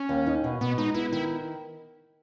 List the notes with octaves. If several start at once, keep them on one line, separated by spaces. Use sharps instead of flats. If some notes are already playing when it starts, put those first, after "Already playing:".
Already playing: C#4
D#2
D#4
B2
B2 B3
G#3 D#4
B3 E4
D#3 E4